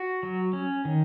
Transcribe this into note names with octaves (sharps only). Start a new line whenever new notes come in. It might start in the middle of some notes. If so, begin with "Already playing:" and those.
Already playing: F#4
F#3
C#4
D#3